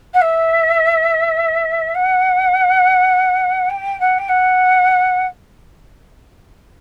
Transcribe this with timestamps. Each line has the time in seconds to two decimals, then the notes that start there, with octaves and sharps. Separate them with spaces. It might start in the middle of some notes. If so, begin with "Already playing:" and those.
0.13 F#5
0.21 E5
1.94 F#5
3.69 G5
3.99 F#5
4.18 G5
4.28 F#5